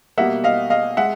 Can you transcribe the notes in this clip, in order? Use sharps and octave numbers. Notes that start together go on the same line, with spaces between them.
B2 G3 A#3 E5 F#5
D#5 F5
D#5 F5
G#3 E5 F#5